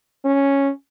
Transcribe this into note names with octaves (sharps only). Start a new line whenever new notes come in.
C#4